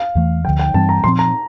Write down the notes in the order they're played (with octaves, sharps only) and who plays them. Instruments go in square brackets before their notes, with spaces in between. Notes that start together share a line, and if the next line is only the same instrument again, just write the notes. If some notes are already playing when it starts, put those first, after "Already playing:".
Already playing: [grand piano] F5
[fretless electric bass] E2 E3 A3
[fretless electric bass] F3 [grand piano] G5
[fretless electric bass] D2 D3
[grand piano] G5
[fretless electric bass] G2 E3 G3 C4 [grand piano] A5
[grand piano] A#5
[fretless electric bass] A#2 F3 C4 [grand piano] C6
[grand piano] A#5